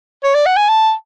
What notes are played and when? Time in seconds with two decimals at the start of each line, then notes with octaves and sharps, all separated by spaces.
0.24 C#5
0.34 D5
0.46 F#5
0.57 G#5
0.68 A5